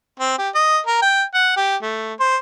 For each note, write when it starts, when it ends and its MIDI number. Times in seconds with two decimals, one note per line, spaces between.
0.20 0.38 60
0.38 0.49 67
0.55 0.78 75
0.86 1.00 70
1.02 1.23 79
1.34 1.54 78
1.56 1.76 67
1.82 2.13 57
2.19 2.36 72